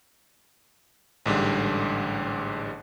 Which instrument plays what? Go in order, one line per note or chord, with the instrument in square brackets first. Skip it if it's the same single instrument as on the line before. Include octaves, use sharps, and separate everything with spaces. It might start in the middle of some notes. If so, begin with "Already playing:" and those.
[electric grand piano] A1 G#2 D3 G3